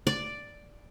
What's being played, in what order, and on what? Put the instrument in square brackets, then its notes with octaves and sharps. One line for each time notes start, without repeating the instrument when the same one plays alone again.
[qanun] D5